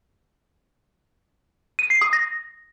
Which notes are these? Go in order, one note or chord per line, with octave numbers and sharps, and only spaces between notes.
D#7
C7
D#6
A#6